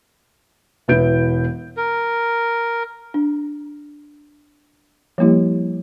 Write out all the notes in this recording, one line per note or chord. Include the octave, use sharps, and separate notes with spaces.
E1 E3 B3 E4 G6 D7
A#4
D4
F3 G3 A#3 E4 G4